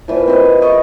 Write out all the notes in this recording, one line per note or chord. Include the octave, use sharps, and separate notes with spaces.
A#2 E3 F3
C4 C#5 D#5
B4
G#4 D#5 C#6